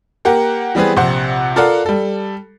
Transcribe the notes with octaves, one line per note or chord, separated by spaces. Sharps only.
A#3 G4 A#4 F#5
E3 G3 B3 C4 G#4 B4
A#1 C3 C5 F#5
F4 A4 A#4 D5 F5 F#5
G3 A4